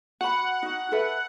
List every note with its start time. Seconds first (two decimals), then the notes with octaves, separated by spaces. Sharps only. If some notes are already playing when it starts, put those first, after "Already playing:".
0.21 F#4 F#5 B5
0.62 D#4 F#4
0.92 A4 B4 E5